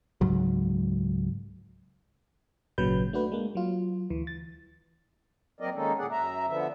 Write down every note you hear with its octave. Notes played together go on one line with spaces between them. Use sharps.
C#2 G#2 F#3
G#1 A#2 C#3 F#3 B4 G6
A3 D4 F#4 B4
G#3 A#3
F#3 F4
D2 E3
A6
F#3 A#3 C4 A#4 D5 D#5
D#3 G#3 A#3 C#4 D#4 A4
D#2 A#2 D3 G#4 D5 F#5
F#2 E5 A#5
D3 F3 B3 E5